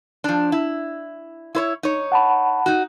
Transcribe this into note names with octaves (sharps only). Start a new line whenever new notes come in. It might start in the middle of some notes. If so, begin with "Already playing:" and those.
F3 D4
E4
E4 C5 C#5
D#4 C#5
F#5 A5 B5
D#4 F#4